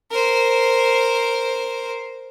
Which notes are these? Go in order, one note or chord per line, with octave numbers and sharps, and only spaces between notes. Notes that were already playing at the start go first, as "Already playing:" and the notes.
A#4 C5